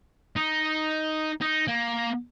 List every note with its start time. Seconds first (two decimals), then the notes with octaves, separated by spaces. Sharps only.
0.36 D#4
1.41 D#4
1.68 A#3